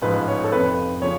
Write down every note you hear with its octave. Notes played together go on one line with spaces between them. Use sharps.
A1 G#2 F3 B4
C#5
A4
F1 F2 F3 B4
C#3 F3 C#5